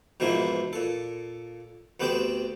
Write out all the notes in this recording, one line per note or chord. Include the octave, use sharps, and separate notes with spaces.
G#2 B2 E3 F3 A#3 E4
A#2 A4
D2 B3 C4 D4 G4 G5